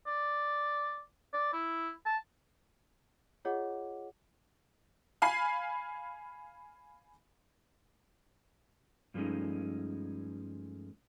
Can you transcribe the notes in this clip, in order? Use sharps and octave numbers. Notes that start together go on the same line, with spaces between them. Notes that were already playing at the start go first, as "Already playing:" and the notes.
D5
D5
E4
A5
F4 G#4 C#5 D#5 F#5 D6
F5 G#5 B5 C7
G2 F3 G#3 A3 C#4 D#4